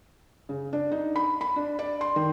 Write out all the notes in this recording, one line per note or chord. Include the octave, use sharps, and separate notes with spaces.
C#3
D4
D#4
B5
B5
D4
D5
C6
D#3